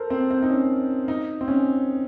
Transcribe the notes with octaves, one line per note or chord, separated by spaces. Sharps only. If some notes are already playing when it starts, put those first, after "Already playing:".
Already playing: A4 A#4 C5
C4
C4
D#4
C#4
D#4
C4
C#4